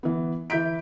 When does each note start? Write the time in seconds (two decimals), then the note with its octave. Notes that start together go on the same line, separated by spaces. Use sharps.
0.03 E3 B3
0.50 E3 E4 G6 B6 D7